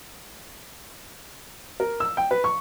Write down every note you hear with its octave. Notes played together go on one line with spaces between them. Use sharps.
A#4
E6
G5
B4
C#6